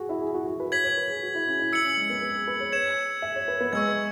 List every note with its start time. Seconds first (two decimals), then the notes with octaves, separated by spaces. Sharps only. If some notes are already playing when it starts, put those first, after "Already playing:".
Already playing: F#4 G#4
0.09 E4
0.21 G#4
0.34 F#4
0.47 F#4
0.60 B4
0.72 C#5 G#6 B6 F#7
0.84 C#5
0.97 B4
1.09 G#4
1.23 F#4
1.35 E4
1.47 C#4
1.59 E4
1.73 E6 C#7 F#7
1.85 C#4
1.97 G#3
2.10 B3
2.22 B4
2.35 G#4
2.47 B4
2.60 C#5
2.72 C#5 G#6 E7
3.22 E5
3.36 C#5
3.48 B4
3.61 B3
3.73 G#3 C#6 E6 G#6